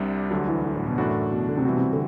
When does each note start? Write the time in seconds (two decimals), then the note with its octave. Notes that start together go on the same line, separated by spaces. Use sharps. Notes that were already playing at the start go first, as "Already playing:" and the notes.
Already playing: C2 C3 G3 D4
0.31 D2 D3 F#3 G3
0.48 E3
0.65 E3
0.75 A2
0.87 B2
0.98 F#2 A2 E3 A3 D4 F#4
1.31 B2
1.49 D3
1.57 C3
1.65 B2 E3 G3 C4 F#4
1.77 C3
1.93 D3